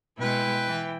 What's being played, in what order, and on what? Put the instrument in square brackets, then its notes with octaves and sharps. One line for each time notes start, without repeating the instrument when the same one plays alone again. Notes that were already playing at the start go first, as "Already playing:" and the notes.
[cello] B2 G#3 [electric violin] E4 G5 [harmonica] B4
[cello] E3